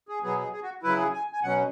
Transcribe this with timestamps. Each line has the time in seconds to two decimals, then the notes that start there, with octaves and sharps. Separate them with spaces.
0.09 G#4
0.23 B2 F#3 B3 G#4
0.38 G#4
0.53 G#4
0.63 F#4
0.83 C#3 F#3 E4 B4
0.97 G#4
1.13 G#5
1.33 G#5
1.43 B2 F#3 C#4 F#5